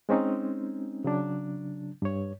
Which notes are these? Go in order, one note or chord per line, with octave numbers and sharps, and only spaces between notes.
G#3 C4 C#4 D#4
C#3 F#3 D4
G2 C#5